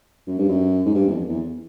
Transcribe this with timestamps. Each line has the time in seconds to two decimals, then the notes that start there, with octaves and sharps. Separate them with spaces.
0.27 F#2
0.38 G2
0.48 F#2
0.85 G#2
0.94 G2
1.07 E2
1.11 F2
1.29 E2